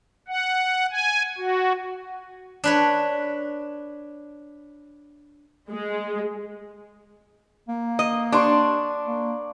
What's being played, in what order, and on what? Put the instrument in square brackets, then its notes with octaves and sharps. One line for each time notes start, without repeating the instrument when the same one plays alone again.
[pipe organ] F#5
G#5
F#4
[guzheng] D4 B4 C#5
[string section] G#3
[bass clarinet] A#3
[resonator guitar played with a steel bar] D#5
[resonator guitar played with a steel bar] D4 [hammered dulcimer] D5 C6 C#6
[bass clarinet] A#3